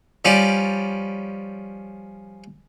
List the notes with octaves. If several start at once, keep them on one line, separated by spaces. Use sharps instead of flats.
F3 G3 C#4 D5